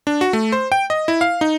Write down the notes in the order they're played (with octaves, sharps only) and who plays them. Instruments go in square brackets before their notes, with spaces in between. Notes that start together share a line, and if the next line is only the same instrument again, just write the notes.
[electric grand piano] D4
F#4
A3
C5
G5
D#5
E4
F5
D#4